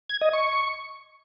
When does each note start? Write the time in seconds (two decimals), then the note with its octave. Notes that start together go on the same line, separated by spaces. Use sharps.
0.09 G#6
0.21 D#5
0.33 C#6